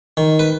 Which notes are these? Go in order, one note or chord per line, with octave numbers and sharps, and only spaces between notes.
D#3
B4